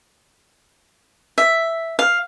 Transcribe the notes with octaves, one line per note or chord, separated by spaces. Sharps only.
E5
F5